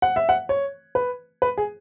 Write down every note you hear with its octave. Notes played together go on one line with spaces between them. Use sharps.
F#5
E5
F#5
C#5
B4
B4
G#4